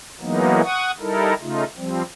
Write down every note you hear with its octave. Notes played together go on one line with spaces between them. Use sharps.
E3 F#3 G#3 A#3 B3 D#4
F#5 C#6 D#6
G3 D#4 E4 A4 A#4
C#3 A3 D#4 F4
F3 G3 C4